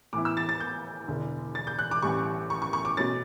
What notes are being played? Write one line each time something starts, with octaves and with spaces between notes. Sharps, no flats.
A2 E3 B3 E4 D6
E6
A6
A6
G6
E1 E2 D3
A6
G6
F#6
D6
A1 A2 E3 G3 C#6
C#6
C#6
C#6
D6
B2 A3 C#4 A6